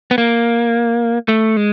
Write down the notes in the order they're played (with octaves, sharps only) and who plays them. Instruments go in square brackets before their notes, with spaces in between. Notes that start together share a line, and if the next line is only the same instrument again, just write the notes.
[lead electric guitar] B3
A#3
A3
G#3